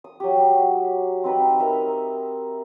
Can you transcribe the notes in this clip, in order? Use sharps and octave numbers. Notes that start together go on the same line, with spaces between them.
D#6
F#3 G4
C4 D#4 B4 B5
A#4 D#5 E5